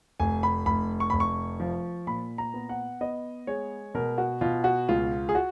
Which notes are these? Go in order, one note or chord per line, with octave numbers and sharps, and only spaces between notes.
F1 G#5
B5
F1 B5
C#6
F1 B5
C#6
F3
A#2 B5
A#5
B3
F#5
B3 D#5
G#3 C#5
B2 A#4
F#4
B2 F4
F#4
C#2 F4
G#4
F#4